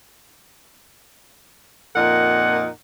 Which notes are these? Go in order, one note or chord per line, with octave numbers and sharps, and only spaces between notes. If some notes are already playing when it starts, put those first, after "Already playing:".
F2 A#2 D#4 A#4 F#5